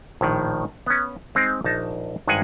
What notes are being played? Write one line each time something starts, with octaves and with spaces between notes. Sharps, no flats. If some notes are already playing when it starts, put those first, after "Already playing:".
A#1 A2 D#3
B3 C#4
G#3 C4 D#4
A#1 D#4 A5
G#1 G2 G#3 G#4 F#5 G#5